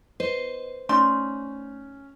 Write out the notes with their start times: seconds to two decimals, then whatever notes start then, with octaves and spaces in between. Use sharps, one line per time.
0.20 B4 C5 D#5
0.89 A3 C#4 D#4 D5 C6